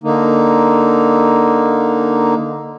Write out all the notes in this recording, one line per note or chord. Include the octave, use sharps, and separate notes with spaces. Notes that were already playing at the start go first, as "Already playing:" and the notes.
D3 A#3 D#4